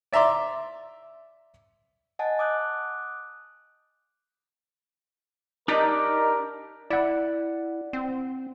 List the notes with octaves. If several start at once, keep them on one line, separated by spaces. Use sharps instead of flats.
D5 E5 A#5 C6 D6
D#5 F#5 G#5 A5 A6
D6 D#6 F#6 G6
D4 D#4 G4 A#4 D5
E4 D5 F#5
C4